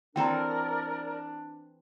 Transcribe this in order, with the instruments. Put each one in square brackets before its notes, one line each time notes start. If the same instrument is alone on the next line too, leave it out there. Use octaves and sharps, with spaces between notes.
[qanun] E3 C4 A4 [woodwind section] D4 [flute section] A#4 D5 [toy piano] G5 A#5